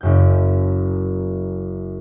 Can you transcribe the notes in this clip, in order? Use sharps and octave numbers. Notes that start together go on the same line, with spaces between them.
F#1 F#2 G6